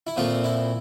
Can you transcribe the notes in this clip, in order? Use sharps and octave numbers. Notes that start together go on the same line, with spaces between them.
E4
A#2 F3 A3 C4 F4
E4